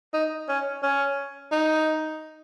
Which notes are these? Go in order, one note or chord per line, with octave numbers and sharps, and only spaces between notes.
D#4
C#4
C#4
D#4